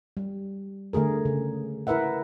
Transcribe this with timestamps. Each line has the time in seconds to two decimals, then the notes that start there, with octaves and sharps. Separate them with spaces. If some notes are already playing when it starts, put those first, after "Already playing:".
0.17 G3
0.93 D3 A3 G#4 A#4
1.25 C#3
1.87 E4 A#4 B4 E5 F#5